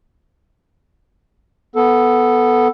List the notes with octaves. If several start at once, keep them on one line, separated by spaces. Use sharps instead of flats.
B3 A4